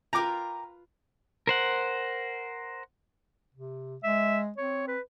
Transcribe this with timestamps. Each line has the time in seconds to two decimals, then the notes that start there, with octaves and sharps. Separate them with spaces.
0.13 F4 A#4 B4 G5 A#5 D6
1.47 A#4 C5 F#5
3.54 C3
4.04 G#3 E5
4.58 C4 C#5
4.88 B4